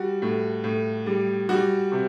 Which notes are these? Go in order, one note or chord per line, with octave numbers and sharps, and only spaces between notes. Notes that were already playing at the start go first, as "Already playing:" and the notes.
Already playing: G3 F#4
A2
A2
G3
G3 F#4
C3